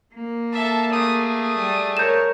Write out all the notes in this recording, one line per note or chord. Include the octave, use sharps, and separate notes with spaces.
A#3
A4 E5 A5
A3 G#4 D#6
D#6
G3
A#4 C#5 G6 E7